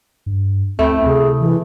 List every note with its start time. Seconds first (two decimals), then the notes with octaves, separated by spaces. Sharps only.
0.26 G2
0.79 D2 A3 C4 E4 G5
1.06 C3 G#4
1.40 E3